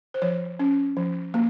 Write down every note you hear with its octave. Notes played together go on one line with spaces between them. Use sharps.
C5
F3 C#5
C#4
F3
A#3